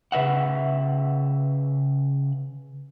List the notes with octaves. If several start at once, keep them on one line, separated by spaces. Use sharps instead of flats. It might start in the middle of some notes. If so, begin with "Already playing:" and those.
C#3 B4 E5 F#5